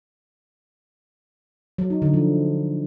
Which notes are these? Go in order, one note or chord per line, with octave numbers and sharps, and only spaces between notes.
F#3
D#4
D3
F3